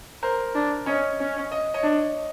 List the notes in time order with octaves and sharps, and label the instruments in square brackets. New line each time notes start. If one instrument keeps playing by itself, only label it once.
[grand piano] A#4 C5
[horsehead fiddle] D4
[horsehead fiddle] C#4 [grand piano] C#5 D#5
[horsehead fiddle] C#4
[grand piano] D#5
C#5 D#5
[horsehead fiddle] D4